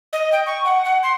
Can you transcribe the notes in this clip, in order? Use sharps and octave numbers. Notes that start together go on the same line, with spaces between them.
D#5
G5
C#6
F#5
F#5
C6